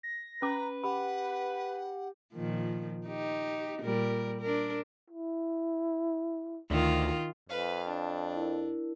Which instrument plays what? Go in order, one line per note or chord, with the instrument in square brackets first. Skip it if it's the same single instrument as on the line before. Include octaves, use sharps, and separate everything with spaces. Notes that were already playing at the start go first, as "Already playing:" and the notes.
[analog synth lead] A#6
[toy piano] C#4 D6 [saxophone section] B4 [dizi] A#5
[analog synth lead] G4 [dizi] F#5 [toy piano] B5
[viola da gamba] A#2 D#3 F3
D#4 G4
A#2 G3 A#4
D4 A#4
[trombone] E4
[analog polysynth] D2 [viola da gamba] D#3 F4
[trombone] F2 [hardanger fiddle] B4 F5
[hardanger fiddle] D4
[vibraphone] E4 A#4